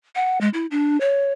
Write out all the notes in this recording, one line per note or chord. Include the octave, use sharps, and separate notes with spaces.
F#5
G#3
E4
D4
C#5